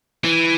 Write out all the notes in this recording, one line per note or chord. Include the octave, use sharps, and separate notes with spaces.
E3